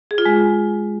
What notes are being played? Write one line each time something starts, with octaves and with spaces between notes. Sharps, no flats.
G#4
F4
G#3